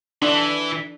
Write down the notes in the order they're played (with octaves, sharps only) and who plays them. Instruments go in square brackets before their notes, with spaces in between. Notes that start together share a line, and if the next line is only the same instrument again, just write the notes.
[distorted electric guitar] E3 [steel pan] D4